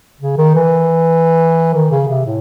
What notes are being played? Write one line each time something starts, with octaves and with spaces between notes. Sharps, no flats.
C#3
D#3
E3
D#3
C#3
C3
A2